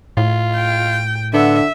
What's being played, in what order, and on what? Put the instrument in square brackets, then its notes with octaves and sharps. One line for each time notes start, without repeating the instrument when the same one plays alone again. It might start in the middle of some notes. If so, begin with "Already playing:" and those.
[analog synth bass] A2 [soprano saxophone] F4
[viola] G5
[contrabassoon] D3 [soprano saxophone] B3 [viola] E5